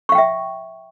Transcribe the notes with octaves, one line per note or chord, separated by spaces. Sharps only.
E5 F5 G5 C#6